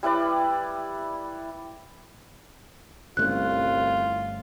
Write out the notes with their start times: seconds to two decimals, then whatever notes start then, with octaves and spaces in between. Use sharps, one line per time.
0.03 G3 E4 B4 D5
3.17 G1 C2 A3 C#4 F4 F#6